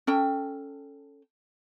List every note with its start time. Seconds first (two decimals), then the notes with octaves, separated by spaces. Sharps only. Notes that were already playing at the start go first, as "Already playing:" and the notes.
0.07 C#4 A4 G5